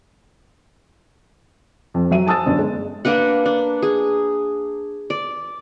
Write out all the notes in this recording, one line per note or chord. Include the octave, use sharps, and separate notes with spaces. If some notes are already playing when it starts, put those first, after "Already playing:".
F2
F#3 E5 D#7
G#5 A5 D#6 E6 A6
G1 F#2
G#3
A#3 D4 B4 F#5
D4
G#4
D5